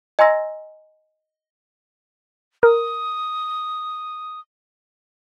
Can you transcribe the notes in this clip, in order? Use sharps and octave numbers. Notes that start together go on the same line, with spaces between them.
D#5 G#5 A#5 C6 E6 A#6
A#4 D#6